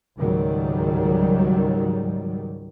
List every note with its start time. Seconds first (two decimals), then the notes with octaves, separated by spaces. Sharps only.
0.18 C#2 G#2 D#3 F#3 G3